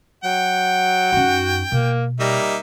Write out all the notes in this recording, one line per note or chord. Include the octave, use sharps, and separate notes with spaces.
F#3 F#5 G5
F#2 D#4 F#4
B2 A#3
G3 A#3 D#4 E5